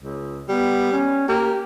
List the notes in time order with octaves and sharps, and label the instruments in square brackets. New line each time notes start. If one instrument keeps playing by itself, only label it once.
[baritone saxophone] C#2
[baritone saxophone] G3 [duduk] B3
[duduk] C#4
[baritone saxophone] A#3 [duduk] G4